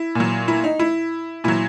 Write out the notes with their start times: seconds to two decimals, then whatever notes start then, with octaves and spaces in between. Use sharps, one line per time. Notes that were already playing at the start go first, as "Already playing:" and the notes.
Already playing: E4
0.15 A#2 F#3
0.48 E4
0.64 D#4
0.79 E4
1.44 A#2 F#3 E4